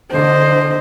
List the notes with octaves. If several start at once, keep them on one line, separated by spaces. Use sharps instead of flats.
D3 C5 D#5